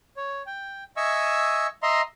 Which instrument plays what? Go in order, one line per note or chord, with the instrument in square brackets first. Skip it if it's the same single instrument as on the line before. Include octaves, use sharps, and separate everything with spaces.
[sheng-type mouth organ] C#5
G5
D#5 E5 G#5 C#6 E6
D#5 E5 A#5 C6